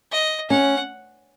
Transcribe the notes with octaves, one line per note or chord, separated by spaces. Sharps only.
D#5
C#4 F#5